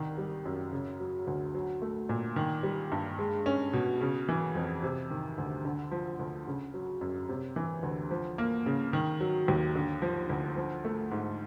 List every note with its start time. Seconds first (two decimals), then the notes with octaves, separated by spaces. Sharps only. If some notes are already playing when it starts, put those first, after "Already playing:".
Already playing: C2 D#3
0.18 G3
0.46 F#2
0.72 C#3
1.00 F#3
1.27 D2
1.55 F#3
1.82 A3
2.09 A#2
2.36 D#3
2.63 G3
2.92 G2
3.19 G#3
3.46 C#4
3.73 B2
4.01 C#3
4.29 E3
4.55 F2
4.83 C3
5.10 D#3
5.38 D2
5.65 D3
5.91 F3
6.19 D2
6.47 C#3
6.74 F#3
7.01 F#2
7.29 C3
7.56 E3
7.83 D2
8.11 F3
8.38 A#3
8.66 C#3
8.93 D#3
9.20 F#3
9.48 D#2
9.75 D3
10.02 F3
10.30 D2
10.56 F3
10.85 A3
11.11 G#2